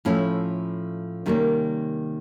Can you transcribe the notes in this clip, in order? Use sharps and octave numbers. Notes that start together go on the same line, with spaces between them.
A2 F3 A3 C#4 E4
C3 D#3 G3 A#3 C#4